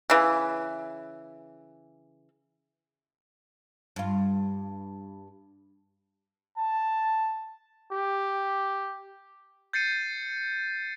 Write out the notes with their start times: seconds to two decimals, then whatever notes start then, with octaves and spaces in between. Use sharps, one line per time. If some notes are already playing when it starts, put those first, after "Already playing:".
0.10 C#3 E3
3.96 G2 F4
6.57 A5
7.91 G4
9.73 G6 A6 C7 C#7 D#7